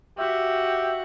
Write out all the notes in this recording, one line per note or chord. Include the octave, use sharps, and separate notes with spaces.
F#4 G4 E5